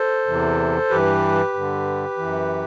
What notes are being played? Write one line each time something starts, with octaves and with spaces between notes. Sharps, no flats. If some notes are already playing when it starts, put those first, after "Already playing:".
Already playing: A4 C5
E2 C3 E3
G2 E3 G4 B4
G2 D3
F#2 E3